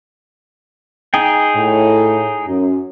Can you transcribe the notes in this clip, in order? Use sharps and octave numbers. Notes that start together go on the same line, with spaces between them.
D#4 G#4 G5
A2
F#2